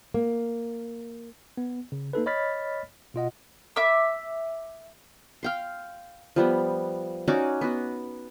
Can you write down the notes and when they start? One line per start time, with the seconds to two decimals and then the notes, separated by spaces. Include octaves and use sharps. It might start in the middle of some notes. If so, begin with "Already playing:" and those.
0.14 A#3
1.57 B3
1.92 C#3
2.13 A#3 D#4 A4 B4
2.26 C#5 D#5 B5 F6 A6 B6
3.14 B2 F4 D#5 F#5
3.76 E5 D6 E6
5.43 F5 G5 C6
6.36 F3 G3 B3
7.28 C#4 D#4 F#4 D5
7.61 B3 F#4